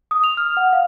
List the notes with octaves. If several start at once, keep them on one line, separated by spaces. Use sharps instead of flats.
D#6
F7
F6
F#5
F5